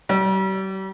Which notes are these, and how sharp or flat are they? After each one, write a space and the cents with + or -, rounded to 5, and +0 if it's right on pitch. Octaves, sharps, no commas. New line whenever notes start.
G3 -40